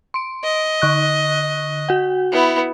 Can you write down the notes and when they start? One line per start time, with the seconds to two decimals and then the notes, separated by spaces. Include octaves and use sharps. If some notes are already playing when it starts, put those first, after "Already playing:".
0.14 C6 D7
0.43 D#5
0.82 D3 C#6 F#6
1.89 F#4 F#5
2.32 B3 E4